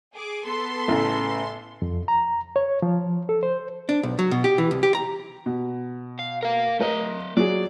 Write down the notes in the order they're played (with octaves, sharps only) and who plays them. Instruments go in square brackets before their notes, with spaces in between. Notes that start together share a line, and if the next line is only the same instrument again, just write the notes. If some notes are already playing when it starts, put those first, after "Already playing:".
[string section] G#4 D6
B3 A4 C6
[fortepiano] A1 C#3 A3
[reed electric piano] F2
A#5
C#5
F3
A4
C5
[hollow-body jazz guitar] D4
B1
F#3
B2
G4
E3
C2
G4
A#5
[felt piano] B2
[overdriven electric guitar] F5
A#4 F5
[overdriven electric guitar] A3 D#5 [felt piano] A#4
[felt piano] F#3 F#4 G#4 [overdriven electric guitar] D5